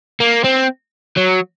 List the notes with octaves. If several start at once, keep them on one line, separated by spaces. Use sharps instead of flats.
A#3
C4
F#3